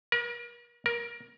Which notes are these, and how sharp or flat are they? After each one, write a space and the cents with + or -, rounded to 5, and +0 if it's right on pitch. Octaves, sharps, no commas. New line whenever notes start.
A#4 +40
A#4 +20